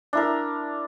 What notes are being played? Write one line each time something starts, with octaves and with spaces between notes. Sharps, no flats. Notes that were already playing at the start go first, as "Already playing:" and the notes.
D4 E4 A#4